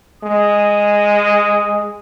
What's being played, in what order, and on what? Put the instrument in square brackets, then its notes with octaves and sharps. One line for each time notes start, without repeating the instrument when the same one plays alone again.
[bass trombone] G#3 [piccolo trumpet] D#6